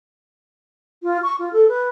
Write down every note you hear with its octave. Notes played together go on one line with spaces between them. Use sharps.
F4
C#6
F4
A4
B4